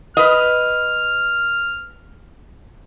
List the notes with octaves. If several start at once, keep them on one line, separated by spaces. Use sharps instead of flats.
B4 D#5 F6